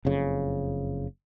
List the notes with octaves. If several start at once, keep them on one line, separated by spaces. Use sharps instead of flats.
F#1 F2 C#3